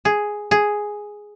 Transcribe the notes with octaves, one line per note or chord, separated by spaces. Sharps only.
G#4
G#4